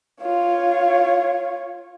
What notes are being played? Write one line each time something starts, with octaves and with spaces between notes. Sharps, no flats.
F4 C#5